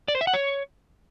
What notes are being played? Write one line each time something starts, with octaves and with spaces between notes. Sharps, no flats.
D5
C5
E5
F#5
C#5